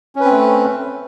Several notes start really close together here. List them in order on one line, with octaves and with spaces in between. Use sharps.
C#4 B4 C4 A3